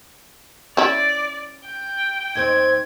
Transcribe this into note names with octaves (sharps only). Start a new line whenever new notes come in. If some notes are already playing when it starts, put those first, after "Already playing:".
C#4 E4 D5
G5
D#2 C4 G#6